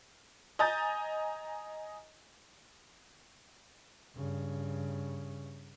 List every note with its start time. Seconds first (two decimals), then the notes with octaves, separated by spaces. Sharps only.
0.59 D#5 G#5 A#5 D#6 G6 A6
4.15 G2 C#3